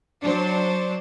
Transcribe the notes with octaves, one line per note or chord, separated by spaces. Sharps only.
F#3 D4 C5